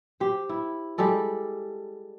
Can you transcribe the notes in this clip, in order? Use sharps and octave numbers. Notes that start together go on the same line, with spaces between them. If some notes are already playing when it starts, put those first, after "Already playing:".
G4 C5
E4
G3 G#3 A4 D5